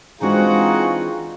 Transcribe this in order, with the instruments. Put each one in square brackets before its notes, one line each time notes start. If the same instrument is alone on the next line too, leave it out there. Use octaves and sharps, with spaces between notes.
[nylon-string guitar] E3 G#3 D4 [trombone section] C4 G#4 [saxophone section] D#4 F#4 [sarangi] F4